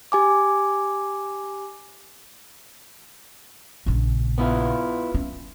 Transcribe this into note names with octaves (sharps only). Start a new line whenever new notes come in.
G4 G#5 D6
A#1 C#3
B3 E4 F4
C#4